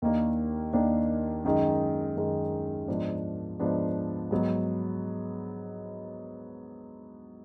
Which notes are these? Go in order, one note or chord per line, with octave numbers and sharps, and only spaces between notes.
D#2 D#3 A#3 D4
D#2 D#3 A#3 D4
F#2 D#3 G#3 D#4
F#2 D#3 G#3 D#4
G#2 F3 B3 D4
G#2 F3 B3 D4
G#2 F#3 B3